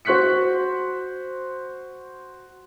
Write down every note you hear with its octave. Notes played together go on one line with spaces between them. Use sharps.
F#4 C5 C#6 F#6 B6 C#7